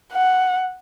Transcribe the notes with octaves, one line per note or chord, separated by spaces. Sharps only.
F#5